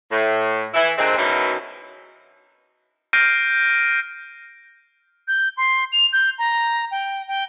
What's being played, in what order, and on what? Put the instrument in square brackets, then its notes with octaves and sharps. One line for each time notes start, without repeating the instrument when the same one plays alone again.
[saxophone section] A2
E3 E4
A#2 D3 G#3 C4
F#2 B2 E3 C#4 D#4 E4
[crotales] F6 G6 A#6 C7 D7 D#7
[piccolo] G6
C6
F7
G6
A#5
G5
G5